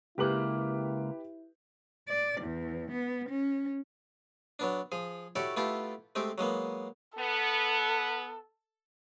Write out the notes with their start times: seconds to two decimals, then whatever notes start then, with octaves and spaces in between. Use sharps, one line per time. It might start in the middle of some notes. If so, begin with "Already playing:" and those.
0.18 C#2 A#3 E4 G4 B4 F#7
2.09 D5
2.41 E2
2.91 B3
3.29 C#4
4.59 F#3 B3 D4
4.92 F3 G#4
5.36 E4 F#4 G4 A4 C#5 D5
5.57 A3 B3 E4 F4 G4 A4
6.15 G#3 A3 C4 G4
6.38 F#3 G#3 A#3 B3
7.18 B3 A4